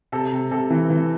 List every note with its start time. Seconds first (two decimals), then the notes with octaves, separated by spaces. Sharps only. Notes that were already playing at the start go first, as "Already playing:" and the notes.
0.12 C3 A4
0.32 C3
0.51 C3 A4
0.70 E3
0.90 E3